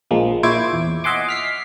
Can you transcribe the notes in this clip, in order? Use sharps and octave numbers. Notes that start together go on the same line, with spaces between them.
A#1 F3 G#3 A#3
A#2 E4 C5 C#5 D6 G#6
E2
D#5 E5 F#5 G#5 C6 D6
F6 B6 C7